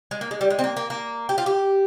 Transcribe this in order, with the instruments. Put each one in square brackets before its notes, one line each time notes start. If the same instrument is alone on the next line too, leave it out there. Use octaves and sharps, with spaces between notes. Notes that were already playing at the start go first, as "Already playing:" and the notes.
[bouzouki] G#3
A#3
G#3
G3
G#3
C4
A#3
A#3
A#3
G4
F4
G4